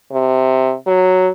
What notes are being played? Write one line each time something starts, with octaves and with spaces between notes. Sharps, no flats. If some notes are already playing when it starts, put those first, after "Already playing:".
C3
F#3